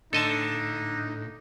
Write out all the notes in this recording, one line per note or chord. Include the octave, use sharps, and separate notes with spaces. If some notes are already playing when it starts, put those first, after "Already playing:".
A2 D3 D#4 A4 D#5 A5